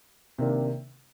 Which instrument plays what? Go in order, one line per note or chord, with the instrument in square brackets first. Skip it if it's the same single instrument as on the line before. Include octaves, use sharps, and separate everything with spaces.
[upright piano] C3 D#3 A#3 D4